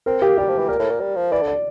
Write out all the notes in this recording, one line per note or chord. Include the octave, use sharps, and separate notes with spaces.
C4 A#4
A#3 G4
G3 G4
F3
E3
A#2 A#4
A2
A#2
G3
F3
E3 D5
D3
D5